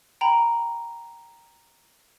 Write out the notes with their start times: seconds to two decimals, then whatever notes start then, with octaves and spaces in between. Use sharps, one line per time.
0.21 G5 A#5 B5